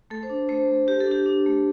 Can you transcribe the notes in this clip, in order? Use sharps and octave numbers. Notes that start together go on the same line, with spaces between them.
A3 A4
C5
D4
A3 C5
A3
A3 G4
A4
D4 G4
D4
A3